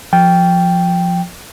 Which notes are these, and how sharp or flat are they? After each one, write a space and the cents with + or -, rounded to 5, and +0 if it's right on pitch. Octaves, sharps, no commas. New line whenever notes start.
F3 +10 G5 +0